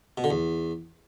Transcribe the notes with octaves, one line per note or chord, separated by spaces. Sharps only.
B2
D3
E2